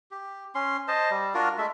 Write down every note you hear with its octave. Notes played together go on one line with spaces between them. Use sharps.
G4
C#4 C6
C5 D#5 A5
G3
D4 F4 F#4 A#4
G#3 A3 E5